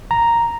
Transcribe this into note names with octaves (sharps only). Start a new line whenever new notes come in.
A#5